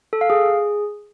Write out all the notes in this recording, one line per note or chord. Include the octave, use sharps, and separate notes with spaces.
A4
F5
G#4